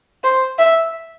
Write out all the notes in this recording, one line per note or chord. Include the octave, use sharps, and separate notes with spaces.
C5
E5